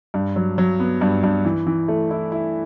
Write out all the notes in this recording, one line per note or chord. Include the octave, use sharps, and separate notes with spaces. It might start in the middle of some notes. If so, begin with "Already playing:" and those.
G2
F#3
F#3
B3
G2
G2
E3
E3
A3
E4
E4